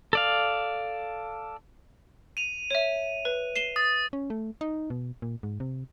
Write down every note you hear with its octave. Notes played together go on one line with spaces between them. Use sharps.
A4 D5 F5
D#7 F7
C#5 E5
B4
C7 E7 G7
D#6 A6
C#4
A3
D#4
B2
A#2
G#2
C3